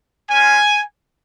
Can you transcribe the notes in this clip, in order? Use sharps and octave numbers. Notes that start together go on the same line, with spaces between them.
G#3 C#4 F4 G#5